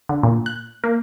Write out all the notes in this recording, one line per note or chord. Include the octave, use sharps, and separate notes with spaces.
D3
A#2
F#6
A#3